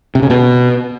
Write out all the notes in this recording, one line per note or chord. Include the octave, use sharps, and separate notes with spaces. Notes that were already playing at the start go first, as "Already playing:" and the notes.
C3
C#3
B2